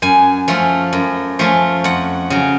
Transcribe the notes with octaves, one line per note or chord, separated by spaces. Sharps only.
F#2 G#5
F3 A3 C#4
F#2
F3 A3 C#4
F2 F#5
C#3 F#3